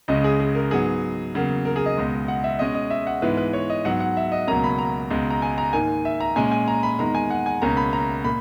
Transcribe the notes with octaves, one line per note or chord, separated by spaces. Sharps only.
C#2 C#3 G#3 C#4 D#5
G#4
G#4
A#4
G#2 F#3 B3 G#4
E2 C#3 F#3 A#3
A#4
G#4
D#5
C#2 B2 G#3
F#5
E5
B2 G#3 C#4 D#5
D#5
E5
F#5
G#2 E3 G#3 B3 B4
B4
C#5
D#5
G#2 F#3 B3 F#5
F#5
E5
D#5
C#2 B2 F#3 A#3 C#4 A#5
B5
A#5
C#2 B2 G#3
A#5
G#5
A#5
G#2 D#3 A#3 G#5
E5
A#5
A#2 G#3 C#4 G#5
G#5
A#5
B5
E2 D#3 G#3 A#5
G#5
F#5
G#5
C#2 B2 A#3 C#4 A#5
B5
A#5
A#2 A#3 B5